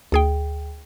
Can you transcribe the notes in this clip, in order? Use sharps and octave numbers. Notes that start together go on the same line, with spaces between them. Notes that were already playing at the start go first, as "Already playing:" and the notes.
D2 G#4 G5